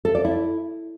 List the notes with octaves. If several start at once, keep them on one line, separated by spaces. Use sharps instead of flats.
A4
D5
E4